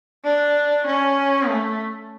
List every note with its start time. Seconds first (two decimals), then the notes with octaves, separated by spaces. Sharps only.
0.24 D4
0.86 C#4
1.48 A3